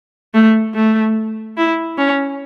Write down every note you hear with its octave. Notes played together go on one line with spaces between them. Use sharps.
A3
A3
E4
C#4